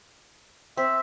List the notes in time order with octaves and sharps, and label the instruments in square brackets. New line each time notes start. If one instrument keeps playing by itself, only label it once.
[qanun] C4 [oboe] E5